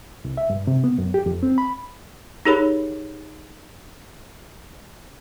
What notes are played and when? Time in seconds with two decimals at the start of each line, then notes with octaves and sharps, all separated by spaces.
0.25 C2
0.37 E5
0.50 G2
0.67 C3
0.84 B3
0.98 F#2
1.14 G4
1.26 F2
1.43 C4
1.58 B5
2.45 D#4 G4 G#4 A#4 C#5 B5